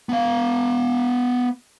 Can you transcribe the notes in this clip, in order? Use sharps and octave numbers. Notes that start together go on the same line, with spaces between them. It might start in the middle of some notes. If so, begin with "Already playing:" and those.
B3 F5